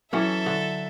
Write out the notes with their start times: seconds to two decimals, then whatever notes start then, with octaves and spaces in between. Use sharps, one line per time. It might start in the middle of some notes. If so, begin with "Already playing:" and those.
0.13 E3 F#3 C#4 A4 E5
0.46 D3